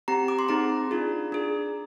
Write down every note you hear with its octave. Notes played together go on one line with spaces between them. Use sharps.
C4 G4 A#5
D6
C6
C4 D#4 G#4 A#5
D4 F4 G#4
D4 G#4